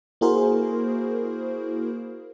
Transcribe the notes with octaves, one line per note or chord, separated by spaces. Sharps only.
A#3 E4 F#4 G#4 A#4 C5